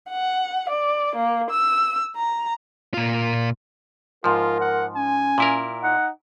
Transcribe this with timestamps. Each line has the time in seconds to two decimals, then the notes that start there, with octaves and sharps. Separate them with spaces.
0.10 F#5
0.70 D5
1.16 A#3
1.50 E6
2.17 A#5
2.94 A#2 F4
4.24 G#2 F3 F4 A#4
4.61 F#5
4.96 C#4 G#5
5.38 A#2 E4 A#4
5.83 D#4 F#5